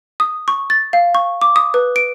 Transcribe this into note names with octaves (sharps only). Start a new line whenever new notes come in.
D#6
C#6
A6
F5
C#6
D6
D#6
B4
D7